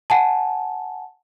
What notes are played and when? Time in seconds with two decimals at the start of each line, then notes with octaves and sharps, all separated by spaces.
0.10 F#5 G#5 A5